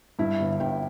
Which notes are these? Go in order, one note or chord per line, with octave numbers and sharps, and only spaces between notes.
G2 E4
G1
G1 G5